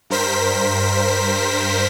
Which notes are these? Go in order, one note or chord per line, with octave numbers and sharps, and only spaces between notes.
G2 A#4 C5 B6